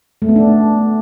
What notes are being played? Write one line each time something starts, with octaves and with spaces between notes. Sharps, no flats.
A3
B3
D4